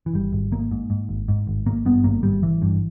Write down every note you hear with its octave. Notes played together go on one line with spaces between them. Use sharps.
E3
G#1 G3
G#1
G#1 A#3
G#2
G#2
G#1
G#2
G#1
G#1 A#3
G2 B3
G#1 A#3
G#1 G3
G#1 E3
G2